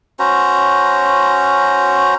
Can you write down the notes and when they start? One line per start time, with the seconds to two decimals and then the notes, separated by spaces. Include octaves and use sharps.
0.19 C#4 F#4 C5 A#5